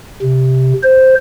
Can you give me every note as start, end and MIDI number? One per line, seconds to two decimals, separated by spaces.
0.22 0.73 48
0.83 1.15 72